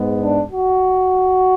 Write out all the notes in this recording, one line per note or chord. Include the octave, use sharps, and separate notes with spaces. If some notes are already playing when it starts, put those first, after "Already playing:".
Already playing: G#2 G#3 B3
D4
F#4